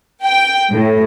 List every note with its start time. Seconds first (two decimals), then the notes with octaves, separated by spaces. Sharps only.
0.24 G5
0.69 A2